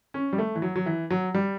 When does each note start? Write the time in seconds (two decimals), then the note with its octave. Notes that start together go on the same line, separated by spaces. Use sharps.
0.14 C#4
0.33 G3
0.38 A3
0.55 E3
0.62 F#3
0.76 F#3
0.86 E3
1.10 F#3
1.34 G3